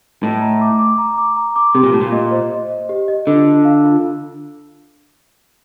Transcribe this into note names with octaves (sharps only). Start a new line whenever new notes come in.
A2 D#5
A#5
D6
D6
A#5
D6
A#5
D6
C3 G4
A#2
A2 G4
A#2
D#5
C5
D#5
D#5
G4
D#5
D3 F4
F4
F5
F4